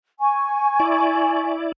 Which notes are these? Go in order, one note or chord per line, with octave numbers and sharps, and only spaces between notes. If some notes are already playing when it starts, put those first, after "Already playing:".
G#5 C#6
E4 D5